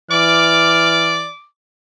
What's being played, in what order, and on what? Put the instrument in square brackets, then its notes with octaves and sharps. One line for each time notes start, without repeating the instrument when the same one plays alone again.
[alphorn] E3 [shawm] D5 [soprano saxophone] D6 [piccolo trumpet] F6